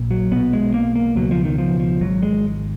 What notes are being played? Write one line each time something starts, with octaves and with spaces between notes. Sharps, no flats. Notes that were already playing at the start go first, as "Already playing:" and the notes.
Already playing: A#1 A#2
F#3
B1 B2 B3
G#3
A#3
A#3
C#2 B2 F#3
F3
D#3
F3
F3
G#1 G#2 F#3
G#3